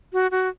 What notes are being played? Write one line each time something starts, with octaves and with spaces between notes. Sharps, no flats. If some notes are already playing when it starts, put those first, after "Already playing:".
F#4
F#4